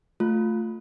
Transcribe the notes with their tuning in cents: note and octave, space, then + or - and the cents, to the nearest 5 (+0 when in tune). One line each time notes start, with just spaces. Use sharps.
A3 +0 F4 +10